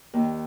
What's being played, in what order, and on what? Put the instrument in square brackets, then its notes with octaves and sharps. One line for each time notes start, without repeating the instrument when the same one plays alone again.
[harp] D#2